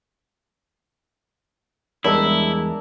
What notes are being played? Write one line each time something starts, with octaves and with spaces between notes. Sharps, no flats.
E2 G3 G#3 D4 E4 A#4 E6